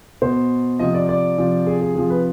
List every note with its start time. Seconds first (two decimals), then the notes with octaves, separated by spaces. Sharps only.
0.22 B2 C5
0.79 C3 F3 D#5
0.94 D5
1.09 D5
1.38 C3 F3
1.67 G#4
1.81 G#4
1.96 C3 F3 G#4
2.10 B4